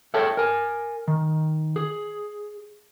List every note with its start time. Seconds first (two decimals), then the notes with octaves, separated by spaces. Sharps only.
0.14 G#4 A4 C#5 E5 G5 A5
0.37 A#4 G#5
1.08 D#3
1.76 G#4